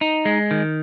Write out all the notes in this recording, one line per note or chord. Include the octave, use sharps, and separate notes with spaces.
D#4
G#3
D#3